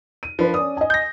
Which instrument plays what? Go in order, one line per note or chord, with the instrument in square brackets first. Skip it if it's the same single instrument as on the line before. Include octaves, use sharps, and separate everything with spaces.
[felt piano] D#7
[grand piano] F3 [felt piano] D4 A#4 B4
[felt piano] C#4 D5 [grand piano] D#6
[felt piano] D#5 G#5
[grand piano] G6 A#6